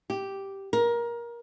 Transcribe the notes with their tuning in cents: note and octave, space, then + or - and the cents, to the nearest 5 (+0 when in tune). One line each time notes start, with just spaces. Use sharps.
G4 -5
A#4 +20